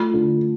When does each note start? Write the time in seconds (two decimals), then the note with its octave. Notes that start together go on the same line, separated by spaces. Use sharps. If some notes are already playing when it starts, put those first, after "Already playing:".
Already playing: A3 F4
0.14 D3